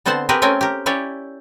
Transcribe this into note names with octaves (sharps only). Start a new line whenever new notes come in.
D3 B3 C4 C5 F#5 A5
C4 G4 G#4 A#4 B4
A3 C4 C#4 A#4 G5 G#5
G4 A#4
C#4 E4 G4 C#5 D5